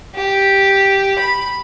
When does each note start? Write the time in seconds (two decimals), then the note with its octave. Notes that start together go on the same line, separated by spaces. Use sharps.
0.15 G4
1.19 B5